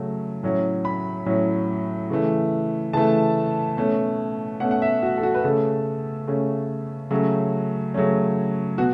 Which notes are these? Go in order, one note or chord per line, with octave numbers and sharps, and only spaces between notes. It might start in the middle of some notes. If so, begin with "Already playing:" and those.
Already playing: C#3 F#3 A3 C#4
A2 F#3 C#4
B5
A2 F#3 C#4
C#3 E3 A3
C#3 E3 A3 A5
B2 A3 C#4
B2 A3 C#4 F#5
F#5
E5
F#4
A4
F#4
B4
C#3 A3 C#4 A4
C#3 A3 C#4
C#3 F#3 A3 C#4
C#3 F#3 A3 C#4
B2 F#4